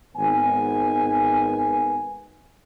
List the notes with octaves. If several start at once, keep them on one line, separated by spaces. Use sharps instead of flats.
G#1 B3 G#5